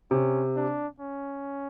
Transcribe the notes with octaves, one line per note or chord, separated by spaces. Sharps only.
C3 C#4
D4
C#4